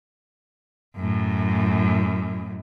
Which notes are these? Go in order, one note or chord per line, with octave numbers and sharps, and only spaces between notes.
F#2 A2